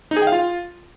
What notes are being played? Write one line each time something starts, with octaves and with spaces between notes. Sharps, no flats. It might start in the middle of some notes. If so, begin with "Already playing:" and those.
D#4
G#4
G5
F5
F4